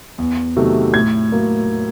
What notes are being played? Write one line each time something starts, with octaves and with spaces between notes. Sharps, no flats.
E2
C3 D#3 F#3 A3
A2 G#6
F#3 A#3